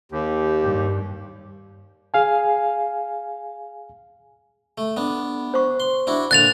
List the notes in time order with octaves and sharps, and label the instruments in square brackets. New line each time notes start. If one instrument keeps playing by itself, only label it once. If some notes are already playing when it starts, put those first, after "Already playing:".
[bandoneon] D#2 [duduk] G4
[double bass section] G2
[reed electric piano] G#4 F5 G#5
[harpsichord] A3
B3 D4
[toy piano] C5 C#6
[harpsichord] C6
D4 E4 F#4
[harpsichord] A#2 D3 [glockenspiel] F#6 A6 F7